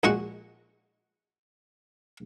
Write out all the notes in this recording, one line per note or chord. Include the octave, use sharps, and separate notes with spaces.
A#1 A#2 G#3 F#4 F#5 C#6